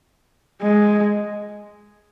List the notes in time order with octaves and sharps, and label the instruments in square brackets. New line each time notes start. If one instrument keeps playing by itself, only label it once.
[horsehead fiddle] G#3